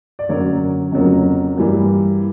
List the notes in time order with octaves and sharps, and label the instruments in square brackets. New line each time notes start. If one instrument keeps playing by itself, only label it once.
[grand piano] D5
F#2 D3 F#3 A#3 C#5
F2 C#3 F#3 A#3
G2 E3 G3 A#3